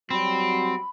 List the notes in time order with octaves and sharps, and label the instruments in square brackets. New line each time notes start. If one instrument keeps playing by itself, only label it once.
[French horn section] F#3 G3 [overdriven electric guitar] C4 [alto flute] B5